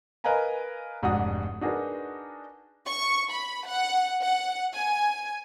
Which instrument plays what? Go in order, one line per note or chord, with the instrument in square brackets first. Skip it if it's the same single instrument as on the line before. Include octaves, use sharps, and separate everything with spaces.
[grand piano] A#4 B4 D#5 F5 G#5 A#5
F1 G#2 D4 F#4 F#5 D#6
D4 D#4 F#4 G#4 A#4 B4
[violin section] C#6
B5
F#5
F#5
G#5